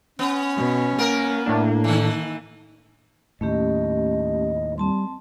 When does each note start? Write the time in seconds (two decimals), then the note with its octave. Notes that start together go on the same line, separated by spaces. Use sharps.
0.19 B3 C#4
0.56 B2
0.99 A#3 B3 A#4
1.46 A2 A3 D4
1.84 D#3 E3
3.41 D#2 A2 A3 C#4 G4 D#5
4.78 G3 C4 A5 C6